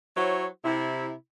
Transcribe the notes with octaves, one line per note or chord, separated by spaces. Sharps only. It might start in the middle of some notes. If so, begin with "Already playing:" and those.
F#3 E4 F#4 C5 C#5
C3 E4